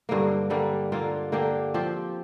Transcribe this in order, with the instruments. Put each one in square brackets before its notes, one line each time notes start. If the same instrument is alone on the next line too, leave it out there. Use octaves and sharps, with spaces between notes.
[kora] G2 D3 A#3
D3 G3 A#3
D3 A#3 F4
D3 A#3 G4
F3 C4 G4